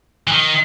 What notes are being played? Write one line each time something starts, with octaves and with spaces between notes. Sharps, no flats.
E3
D#3